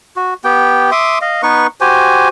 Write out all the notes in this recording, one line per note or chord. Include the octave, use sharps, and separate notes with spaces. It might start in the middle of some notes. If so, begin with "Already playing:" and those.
F#4
B3 G4 G5
E5 C6 D6 D#6
D#5 F5
B3 D#4 B4 C#6
F#4 G4 C5 G#5